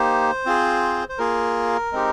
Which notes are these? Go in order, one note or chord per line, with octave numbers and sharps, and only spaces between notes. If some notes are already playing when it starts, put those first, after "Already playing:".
Already playing: A#3 D#4 G4 C5
C4 F4 G#4
C5
A#3 F4 G#4 A#4
G#3 C4 D#4 G4